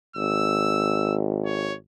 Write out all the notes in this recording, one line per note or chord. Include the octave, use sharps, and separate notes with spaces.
G#1 E6
C#5